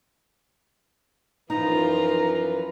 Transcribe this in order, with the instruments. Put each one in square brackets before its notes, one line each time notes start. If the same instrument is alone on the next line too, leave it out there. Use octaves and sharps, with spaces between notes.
[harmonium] F#2 E3 B4 [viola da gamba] F3 F4 [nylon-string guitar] D#4 [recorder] A#5